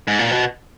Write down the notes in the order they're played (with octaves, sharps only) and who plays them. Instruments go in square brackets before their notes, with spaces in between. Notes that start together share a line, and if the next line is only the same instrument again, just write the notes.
[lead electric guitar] G#2
A#2
B2